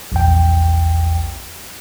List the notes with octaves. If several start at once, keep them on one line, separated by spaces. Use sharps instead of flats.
A#1 E2 G5